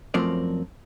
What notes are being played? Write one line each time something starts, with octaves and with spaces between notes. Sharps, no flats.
F#2 F3 A3 C4 A#4 D5